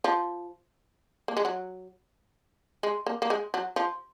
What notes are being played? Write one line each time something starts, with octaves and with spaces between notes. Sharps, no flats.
F3
A#3
G#3
F#3
G#3
A#3
A#3
G#3
F#3
F3